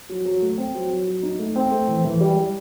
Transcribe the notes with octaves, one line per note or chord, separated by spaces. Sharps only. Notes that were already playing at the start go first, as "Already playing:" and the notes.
F#3
F#3
A3
C4
F#3
F#3
F#3
D#4
A3
C4
A3
E3
E3
G3
G3